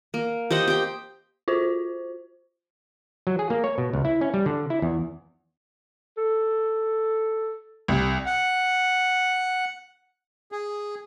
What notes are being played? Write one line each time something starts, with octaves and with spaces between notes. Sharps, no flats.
A#3
G4 C5 D#5 F#5
G4 G5
F4 F#4 C5
F#3
G#4
A#3
C#5
B2
C#2
E4
C#4
G3
D3
E4
E2
A4
C2
F#5
G#4